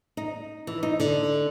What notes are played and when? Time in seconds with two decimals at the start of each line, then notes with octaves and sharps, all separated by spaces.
0.17 D#4
0.67 E3
0.83 D#4
1.00 D3